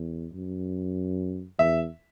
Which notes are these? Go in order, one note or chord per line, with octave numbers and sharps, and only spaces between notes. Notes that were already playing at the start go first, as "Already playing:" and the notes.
Already playing: E2
F#2
E2 E5